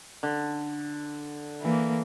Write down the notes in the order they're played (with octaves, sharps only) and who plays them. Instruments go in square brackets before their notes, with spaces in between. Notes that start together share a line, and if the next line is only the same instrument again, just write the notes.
[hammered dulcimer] D3
[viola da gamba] E3 A#3